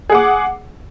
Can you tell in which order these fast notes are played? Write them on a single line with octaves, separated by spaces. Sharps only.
G#4 F#5 D6